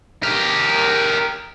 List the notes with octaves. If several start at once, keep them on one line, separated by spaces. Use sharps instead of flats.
G4 A#4